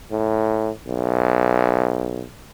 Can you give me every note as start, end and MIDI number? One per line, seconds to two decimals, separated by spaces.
0.11 0.70 45
0.88 2.23 35